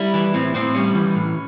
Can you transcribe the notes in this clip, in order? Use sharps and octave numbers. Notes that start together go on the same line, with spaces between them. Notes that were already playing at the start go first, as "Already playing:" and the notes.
Already playing: G3 E4
E3
A2 C4
A2 C4
G3 C#4
E3
A2